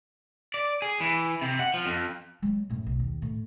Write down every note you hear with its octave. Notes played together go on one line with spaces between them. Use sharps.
D5
G#4
E3
C3
F#5
F3
F2
F#3 G#3
F#2 A2
B1
D#2
A2